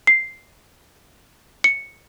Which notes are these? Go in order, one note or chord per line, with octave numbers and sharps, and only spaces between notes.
C7
C#7